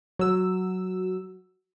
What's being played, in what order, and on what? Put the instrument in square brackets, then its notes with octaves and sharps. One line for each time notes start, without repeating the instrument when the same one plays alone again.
[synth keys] F#3 E6